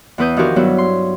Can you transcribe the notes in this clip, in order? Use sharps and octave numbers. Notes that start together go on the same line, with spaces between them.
E2 E3 B3 B4 D#6 G6
D#3 F3 D4 F#4 G4 A#4
G2 F#3 B3 E4
C6